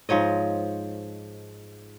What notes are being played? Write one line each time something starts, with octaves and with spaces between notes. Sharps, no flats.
G#2 F3 C#5 D#5